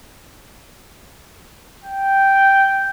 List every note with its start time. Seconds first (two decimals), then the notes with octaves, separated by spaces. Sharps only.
1.84 G5